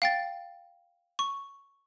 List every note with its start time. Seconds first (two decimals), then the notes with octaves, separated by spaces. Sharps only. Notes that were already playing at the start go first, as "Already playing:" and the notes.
0.02 F5 G5 A6
1.19 C#6